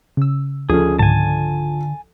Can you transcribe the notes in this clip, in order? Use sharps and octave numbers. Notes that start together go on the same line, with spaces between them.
C#3 E6
D2 F3 C#4 G#4 A4
C#2 G#2 D3 G#5 A5